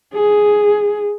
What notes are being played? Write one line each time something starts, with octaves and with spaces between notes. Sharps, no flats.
G#4